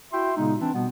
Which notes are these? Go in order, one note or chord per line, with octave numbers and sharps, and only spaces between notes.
E4 F#4 E5 G5 C6
A#2 C#3 G#3 B3 D#4
E3 C4 D4 E4
B2 G3 B3